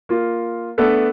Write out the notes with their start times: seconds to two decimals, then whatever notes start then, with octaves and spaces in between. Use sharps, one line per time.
0.09 A#3 F4
0.78 A3 B3 D4 G#4 A4 B4